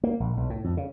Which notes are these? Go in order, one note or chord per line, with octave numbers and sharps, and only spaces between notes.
A#3
A#1
B1
A2
F2
C#3